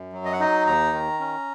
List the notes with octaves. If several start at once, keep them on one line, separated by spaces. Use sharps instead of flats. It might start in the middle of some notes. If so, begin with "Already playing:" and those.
Already playing: F#2
F#3
D#5
F#5
D#4 D#5
D#2 A#5
D#3
C#4